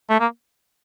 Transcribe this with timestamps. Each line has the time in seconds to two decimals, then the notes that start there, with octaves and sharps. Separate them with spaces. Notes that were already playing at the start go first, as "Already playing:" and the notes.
0.10 A3
0.20 A#3